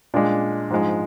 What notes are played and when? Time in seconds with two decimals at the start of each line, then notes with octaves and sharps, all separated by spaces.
0.14 A#2 G#3 D4
0.70 G#2 F3 G#3